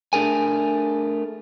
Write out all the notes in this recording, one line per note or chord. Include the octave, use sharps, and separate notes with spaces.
A3 D4 G#4 A#4 G#5